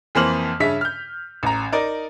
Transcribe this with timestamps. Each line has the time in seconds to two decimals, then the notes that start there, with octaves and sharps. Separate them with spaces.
0.15 F2 E3 A#3 C5 F6 F#7
0.60 G2 C#3 C#4 E5 B6
0.81 F6 G6
1.43 A1 A#5
1.72 D#4 A#4 D5